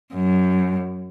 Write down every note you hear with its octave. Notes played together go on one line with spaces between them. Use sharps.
F#2